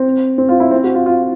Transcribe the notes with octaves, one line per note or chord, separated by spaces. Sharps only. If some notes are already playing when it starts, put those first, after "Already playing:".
Already playing: C4
C4
F4
E4
C4
F#4
F4
F4